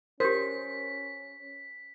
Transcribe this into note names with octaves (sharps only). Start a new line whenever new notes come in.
C#4 G4 A#4 C5 B6